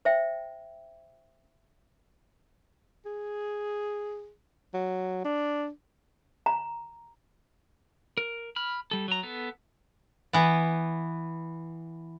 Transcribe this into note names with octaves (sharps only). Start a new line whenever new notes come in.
C5 E5 G5
G#4
F#3
D4
A#5
A#4
B5 F6
G3 A4
F#3 A#5
B3 A4
E3 B3